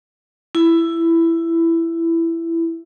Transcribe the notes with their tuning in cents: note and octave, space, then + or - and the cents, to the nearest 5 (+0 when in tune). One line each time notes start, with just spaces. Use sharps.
E4 +10